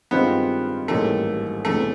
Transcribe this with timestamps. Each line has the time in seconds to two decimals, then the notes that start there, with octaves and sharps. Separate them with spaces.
0.11 G2 D#3 G#3 B3 C4 F4
0.88 A1 G#2 D#3 G3 A3 A#3
1.65 E1 E2 C3 E3 A3